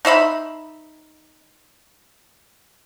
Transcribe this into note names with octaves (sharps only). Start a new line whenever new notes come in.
D#4 C5 E5 B5